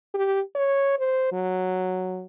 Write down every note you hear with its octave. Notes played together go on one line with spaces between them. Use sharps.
G4
C#5
C5
F#3